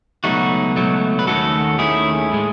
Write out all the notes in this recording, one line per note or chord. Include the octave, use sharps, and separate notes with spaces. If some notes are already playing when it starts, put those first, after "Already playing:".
C#2 B2 F#3 A3 D#4 F#4
C#2 B2 F#3 A3
B4
D#2 D#3 A3 C#4 F#4 A4
D#2 D#3 A3 C#4 E4 G#4
A2 G#3